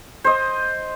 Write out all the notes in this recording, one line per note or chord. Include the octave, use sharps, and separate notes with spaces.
C5 D#5